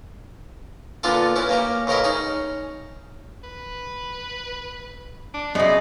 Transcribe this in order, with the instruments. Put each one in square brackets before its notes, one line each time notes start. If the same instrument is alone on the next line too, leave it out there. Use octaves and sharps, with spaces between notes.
[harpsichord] A#2 D3 B3 D4 F4 A4
C#4 E4 B4
A#3 C#4 G4
A1 C#3 C#4 A#4 D#5 E5
C#4 D#4 G#4
[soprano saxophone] B4
D4
[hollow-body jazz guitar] F#2 C#3 [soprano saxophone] D5 [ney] D#5